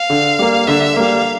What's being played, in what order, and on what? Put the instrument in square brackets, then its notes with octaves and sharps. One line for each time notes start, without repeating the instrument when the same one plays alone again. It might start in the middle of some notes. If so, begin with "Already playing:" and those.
Already playing: [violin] F5
[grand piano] D3
G3 A#3
[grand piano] D3 [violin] E5
[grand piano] G3 A#3 [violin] F5